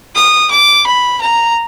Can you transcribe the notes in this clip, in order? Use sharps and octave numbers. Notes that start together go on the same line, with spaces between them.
D#6
D6
B5
A#5